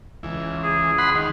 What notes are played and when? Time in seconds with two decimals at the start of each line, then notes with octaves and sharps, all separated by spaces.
0.23 C#2 E3
0.63 G#4
0.98 F#5 B5 C6
1.15 D#3